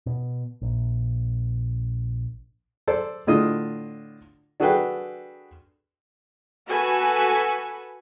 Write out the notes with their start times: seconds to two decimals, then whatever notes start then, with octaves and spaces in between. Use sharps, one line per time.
0.06 B2
0.62 A#1
2.88 A4 C5 D5
3.27 A2 D3 D4 F4 D#5 D#6
4.60 D4 F#4 G#4 A4 B4 G5
6.67 F#4 A4 B4 G#5